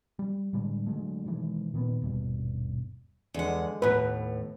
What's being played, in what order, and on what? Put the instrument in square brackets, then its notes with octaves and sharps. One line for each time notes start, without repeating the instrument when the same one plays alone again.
[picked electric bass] G3
A2 D3 G3 G#3
D3 F#3 G#3 A3
B2 D#3 E3 G#3
A#2 D#3 B3
D#1 G2 B2
[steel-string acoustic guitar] E2 F#5 [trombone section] D3 G#3
[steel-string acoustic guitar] D#2 A2 [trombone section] B3 [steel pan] B4